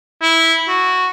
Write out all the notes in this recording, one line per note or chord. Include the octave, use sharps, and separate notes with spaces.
E4
F#4